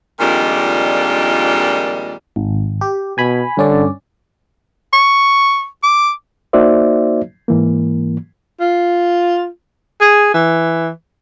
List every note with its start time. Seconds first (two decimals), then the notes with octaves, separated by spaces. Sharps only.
0.20 F2 A#2 D#3 G3 G#3 D4
2.36 G#1
2.81 G4
3.18 B2 G#5 B5
3.57 G2 D3 C#4 D5
4.93 C#6
5.83 D6
6.53 A#3 D#4 F#4 C5 D5 E5
7.48 G#2 E3 A#3
8.60 F4
10.01 G#4
10.34 E3